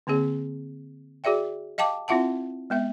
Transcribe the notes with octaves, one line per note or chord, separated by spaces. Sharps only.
D3 A#3 C4 G#4
F#4 G#4 D5 E5 G5
D#5 F5 G5 A5 D6
C4 E4 F4 E5 F#5 A5
G#3 B3 E5